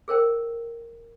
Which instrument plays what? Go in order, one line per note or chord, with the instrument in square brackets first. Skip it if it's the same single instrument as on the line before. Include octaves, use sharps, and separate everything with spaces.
[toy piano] G#4 A#4 C5 G5